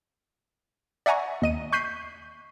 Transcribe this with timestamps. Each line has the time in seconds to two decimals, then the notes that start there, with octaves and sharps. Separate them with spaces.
1.06 D5 E5 F#5 G#5 A#5 C#6
1.42 D#2 D#5 D#7
1.72 C#6 F#6 G6 B6 C7 D#7